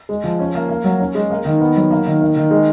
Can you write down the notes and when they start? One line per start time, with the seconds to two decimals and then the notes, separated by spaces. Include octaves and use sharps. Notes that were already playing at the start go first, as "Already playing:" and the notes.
0.09 G#3
0.24 F3
0.39 C#4
0.55 A#3
0.69 A#3
0.84 F#3
1.00 C#4
1.15 G#3
1.30 A#3
1.45 D#3
1.61 B3
1.76 F#3
1.91 A#3
2.06 D#3
2.21 A#3
2.36 D#3
2.51 G#3